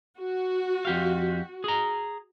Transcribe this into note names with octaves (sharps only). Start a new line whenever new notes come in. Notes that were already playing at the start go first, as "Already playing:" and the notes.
F#4
F2 G4 F5
G#4 A#5